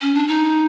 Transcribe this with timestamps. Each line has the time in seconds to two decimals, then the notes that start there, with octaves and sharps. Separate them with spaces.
0.02 C#4
0.15 D4
0.28 D#4